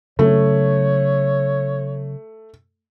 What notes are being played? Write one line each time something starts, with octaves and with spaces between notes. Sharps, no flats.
C#3 F#3 A3 C#5